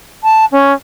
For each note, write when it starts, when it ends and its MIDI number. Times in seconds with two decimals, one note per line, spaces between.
0.24 0.45 81
0.52 0.73 61